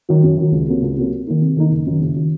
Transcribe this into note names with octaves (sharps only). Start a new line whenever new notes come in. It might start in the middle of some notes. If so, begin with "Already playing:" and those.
D#3 F#3
F#2
D#3 F#3
C#2
C3 F#3 A#3
C#2
C3 F#3 A#3
C3
D#3 A#3 D#4
C3
D#3 A#3 D#4
F#1
F#2 D#3 F#3
F#1
D#3 F#3